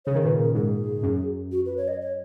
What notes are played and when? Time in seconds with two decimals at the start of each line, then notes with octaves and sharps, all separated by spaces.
0.06 C#3 C#5
0.15 D#3
0.22 A#2 C#3 B4
0.39 A#4
0.54 G#2 G#4
1.03 F#2
1.52 F#4
1.66 B4
1.77 C#5
1.88 D#5
2.01 C#5